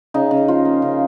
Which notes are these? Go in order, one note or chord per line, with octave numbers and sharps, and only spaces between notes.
C#3 D#4
C#3
F3 F4
A#3
C#3